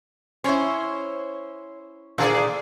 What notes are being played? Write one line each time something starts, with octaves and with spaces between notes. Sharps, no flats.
C#4 E4 C5 C#5
A#2 D3 E3 A#3 G#4 D5